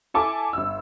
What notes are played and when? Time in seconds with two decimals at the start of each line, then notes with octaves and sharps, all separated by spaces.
0.14 E4 A4 G#5 A5 D6
0.53 G1 E6